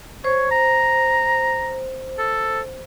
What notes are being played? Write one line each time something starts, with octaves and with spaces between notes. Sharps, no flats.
C5 C#5
A#5
A4